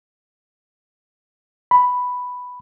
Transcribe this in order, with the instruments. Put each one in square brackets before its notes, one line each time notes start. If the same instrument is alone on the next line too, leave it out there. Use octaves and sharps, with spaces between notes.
[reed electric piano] B5